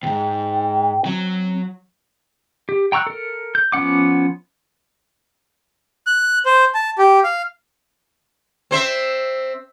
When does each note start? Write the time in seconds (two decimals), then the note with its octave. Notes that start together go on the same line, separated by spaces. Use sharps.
0.03 D2 G#2 G5
1.06 F#3 C4
2.69 G4
2.92 G5 A#5 C#6 E6 F#6
3.07 A4 A#4
3.55 G6
3.72 F3 B3 C#4 F#5 D6
6.07 F#6
6.46 C5
6.75 A5
6.98 G4
7.24 F5
8.71 C4 C5 E5